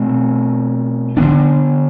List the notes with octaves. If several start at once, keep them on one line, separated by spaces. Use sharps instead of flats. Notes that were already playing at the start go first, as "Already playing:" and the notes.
Already playing: B2 A3 C4
D3 F3 B3 D4